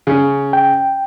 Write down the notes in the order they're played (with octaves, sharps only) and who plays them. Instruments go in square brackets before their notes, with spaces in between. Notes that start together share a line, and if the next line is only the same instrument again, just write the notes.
[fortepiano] C#3 C#4
[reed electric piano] G5